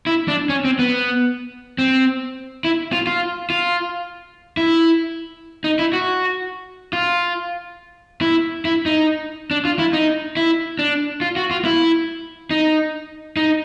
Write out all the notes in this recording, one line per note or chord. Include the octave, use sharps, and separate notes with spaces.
E4
D4
C#4
C4
B3
C4
E4
F4
F4
F4
E4
D#4
E4
F#4
F4
E4
E4
D#4
D4
F4
E4
D#4
E4
D4
F4
F#4
F4
E4
D#4
D#4